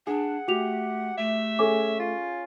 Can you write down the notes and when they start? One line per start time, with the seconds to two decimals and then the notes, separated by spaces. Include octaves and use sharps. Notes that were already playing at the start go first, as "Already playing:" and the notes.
0.07 D4 G#4 F#5
0.48 A3 F#4 G4 F7
1.18 A3 E5
1.59 C#4 G#4 A4 D6
1.99 F4